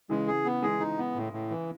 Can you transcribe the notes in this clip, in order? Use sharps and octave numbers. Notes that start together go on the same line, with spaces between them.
C#3 E3 G#3
G#4
B3
E3 G#3 G#4
D#4
B3
A2
A2
E3